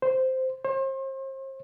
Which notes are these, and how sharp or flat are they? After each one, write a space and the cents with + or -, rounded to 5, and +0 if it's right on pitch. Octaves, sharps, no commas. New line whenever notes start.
C5 -5
C5 +40